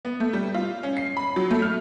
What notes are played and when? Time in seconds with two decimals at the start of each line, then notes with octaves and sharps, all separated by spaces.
0.05 B3
0.20 A3
0.33 G3
0.54 F4
0.83 C#4
0.97 C7
1.17 B5
1.36 F#3
1.51 A3
1.62 F6